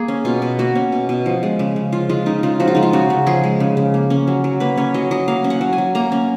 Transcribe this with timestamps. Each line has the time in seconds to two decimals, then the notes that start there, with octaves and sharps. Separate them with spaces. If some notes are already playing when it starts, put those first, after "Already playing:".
Already playing: A#3 G#4
0.08 C#4
0.25 B2 F4
0.42 B2
0.59 A#3 F#4
0.75 C#4
0.92 B2
1.09 B2
1.26 F3
1.43 G#3
1.59 C#3
1.76 C#3
1.93 F3 F4
2.09 G#3 F4
2.26 C#3 D#4
2.43 C#3 F4
2.60 F3 F#4
2.68 F4
2.75 G#3 D#4
2.83 F4
2.93 C#3 F#4
3.10 C#3
3.27 F3 G#4
3.44 G#3
3.60 C#3
3.77 C#3
3.94 A#3
4.10 C#4
4.27 F#3
4.44 F#3
4.60 A#3 B4
4.77 C#4 C#5
4.94 F#3 D#5
5.11 F#3 D#5
5.28 A#3 F5
5.44 C#4
5.50 F#5
5.61 F#3
5.73 G#5
5.78 F#3
5.95 A#3 A#5
6.12 C#4